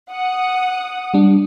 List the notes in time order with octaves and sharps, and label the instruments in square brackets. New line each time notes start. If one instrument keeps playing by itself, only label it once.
[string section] F#5 D#6
[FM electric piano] G3 D4